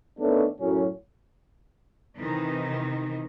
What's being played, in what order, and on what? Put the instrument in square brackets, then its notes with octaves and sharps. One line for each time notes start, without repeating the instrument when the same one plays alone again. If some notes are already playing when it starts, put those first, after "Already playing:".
[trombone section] D#3 A3 B3 C#4 D4
F#2 A2 F#3 C#4
[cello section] C3 D#3 E3 D#4